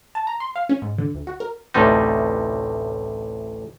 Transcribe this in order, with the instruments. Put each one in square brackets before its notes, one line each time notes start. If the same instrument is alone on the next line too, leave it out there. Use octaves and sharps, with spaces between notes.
[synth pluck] A5
A#5
C6
F5
C#4
G#2
D3
D2
F#4
A#4
[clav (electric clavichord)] A1 D2 A2 C3 G3 D#4